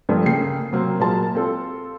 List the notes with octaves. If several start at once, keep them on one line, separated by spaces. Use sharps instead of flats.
G2 F3 A3 A#3
C#3 A3 A#3 G5 C7
C3 F#3 A#3 C4
A#2 F#3 G#3 A#4 A5
C4 F4 A4